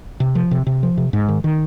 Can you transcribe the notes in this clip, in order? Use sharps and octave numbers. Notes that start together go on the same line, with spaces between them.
C3
F3
C3
C3
F3
C3
G#2
D#3
D#3